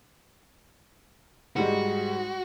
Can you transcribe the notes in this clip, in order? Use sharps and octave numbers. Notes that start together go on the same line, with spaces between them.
G#2 G3 G#3 F#4